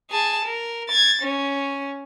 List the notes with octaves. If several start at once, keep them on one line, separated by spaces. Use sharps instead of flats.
G#4 A5
A#4
G#6 A6
C#4